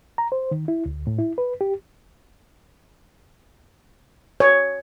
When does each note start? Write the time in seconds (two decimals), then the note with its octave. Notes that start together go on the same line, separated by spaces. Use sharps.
0.18 A#5
0.32 C5
0.51 D#3
0.68 E4
0.86 D2
1.07 A2
1.18 E4
1.38 B4
1.61 G4
4.40 C#5